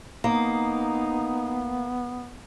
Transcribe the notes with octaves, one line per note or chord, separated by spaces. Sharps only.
A#3 B3 D#4